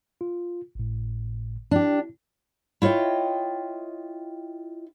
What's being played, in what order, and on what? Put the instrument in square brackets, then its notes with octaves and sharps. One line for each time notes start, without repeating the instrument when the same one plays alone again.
[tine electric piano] F4
G#1 A2
[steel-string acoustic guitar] D4 G4 [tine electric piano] E4
[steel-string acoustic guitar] E4 F4 C#5 D#5 G5